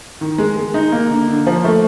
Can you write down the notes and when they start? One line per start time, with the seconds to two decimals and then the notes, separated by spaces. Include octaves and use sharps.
0.21 D#3
0.38 G#3
0.56 G#3
0.74 D#4
0.92 A#3
1.10 D3
1.28 D3
1.47 F3
1.64 A3